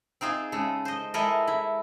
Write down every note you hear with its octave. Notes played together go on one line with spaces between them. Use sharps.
C4 D#4 F4 G#4
C#3 G#3 A4
C5 D#5
G#3 E4 A4 A#4 D#5
E4